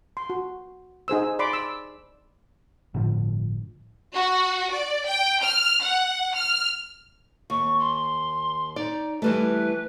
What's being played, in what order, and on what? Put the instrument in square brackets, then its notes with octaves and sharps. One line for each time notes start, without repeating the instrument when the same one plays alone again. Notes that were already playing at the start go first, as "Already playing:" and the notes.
[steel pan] C6
F#4
D#4 G#4 C5 E6
D5 B5 C6 D6
E6
[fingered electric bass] G1 A2 D3 F3
[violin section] F#4
D5
G5
F6
F#5
F6
[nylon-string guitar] D#2 [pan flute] C#6
[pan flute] C6
[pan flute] D#4 [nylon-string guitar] D5
[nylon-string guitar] E3 G3 A3 [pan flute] B4